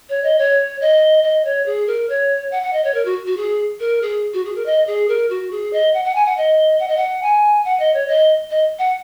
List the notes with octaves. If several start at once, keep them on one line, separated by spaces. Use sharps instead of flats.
C#5
D#5
C#5
D#5
D#5
C#5
G#4
A#4
C#5
F#5
F#5
D#5
C#5
A#4
F#4
F#4
G#4
A#4
G#4
F#4
G#4
A#4
D#5
G#4
A#4
F#4
G#4
D#5
F#5
F#5
G#5
F#5
D#5
F#5
D#5
F#5
G#5
F#5
D#5
C#5
D#5
D#5
F#5